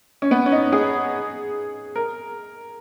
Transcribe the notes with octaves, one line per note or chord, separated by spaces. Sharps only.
C#4
B3
C#4
D#4
G#4
A#4